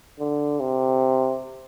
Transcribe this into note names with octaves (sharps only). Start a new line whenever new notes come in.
D3
C3